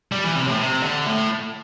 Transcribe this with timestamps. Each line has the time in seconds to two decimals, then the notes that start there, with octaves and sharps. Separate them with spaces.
0.12 G3
0.24 E3
0.36 C3
0.48 A2
0.59 C3
0.83 D3
1.07 A2